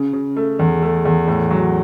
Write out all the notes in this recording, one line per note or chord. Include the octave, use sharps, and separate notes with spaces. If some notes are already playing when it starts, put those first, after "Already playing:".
Already playing: C#3
C#3
A3
E2
A3
E2
A2
F#3